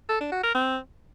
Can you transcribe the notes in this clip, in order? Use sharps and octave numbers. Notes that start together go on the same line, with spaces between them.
A4
D4
F#4
A#4
C4